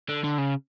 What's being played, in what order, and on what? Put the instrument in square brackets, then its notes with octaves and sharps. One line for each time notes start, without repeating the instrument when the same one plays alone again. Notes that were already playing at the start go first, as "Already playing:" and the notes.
[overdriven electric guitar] D3
D3
C#3